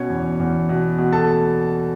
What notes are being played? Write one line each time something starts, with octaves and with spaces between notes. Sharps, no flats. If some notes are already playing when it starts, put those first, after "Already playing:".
Already playing: B2 C#4 C#5
E2
E2
B2
B2
A4 A5